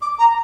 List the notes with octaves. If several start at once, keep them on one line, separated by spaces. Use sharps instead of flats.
D6
A#5